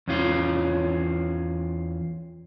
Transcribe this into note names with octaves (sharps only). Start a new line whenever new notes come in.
E2 C#4 F4